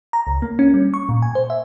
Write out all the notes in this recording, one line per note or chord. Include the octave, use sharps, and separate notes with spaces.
A#5
C#2
A#3
C#4
G3
C#6
A#2
G#5
C5
E5